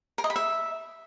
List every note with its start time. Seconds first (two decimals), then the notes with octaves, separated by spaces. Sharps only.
0.18 A#4
0.24 D#5
0.30 B5
0.36 E5